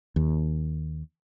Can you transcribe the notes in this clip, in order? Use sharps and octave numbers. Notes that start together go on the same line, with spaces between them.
D#2